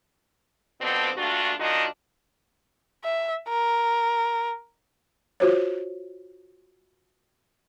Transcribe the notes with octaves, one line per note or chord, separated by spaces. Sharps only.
B2 D3 F3 B3 C4
G2 A#2 A3 D4 F4 F#4
D#2 D#3 D4 F4 F#4 D#5
E5
A#4
F4 F#4 C5 C#5